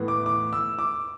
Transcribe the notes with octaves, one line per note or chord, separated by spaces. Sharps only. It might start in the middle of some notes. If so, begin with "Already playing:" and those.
Already playing: A2 E3 B3
D6
D6
E6
D6